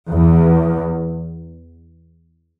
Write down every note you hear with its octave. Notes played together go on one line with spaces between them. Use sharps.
E2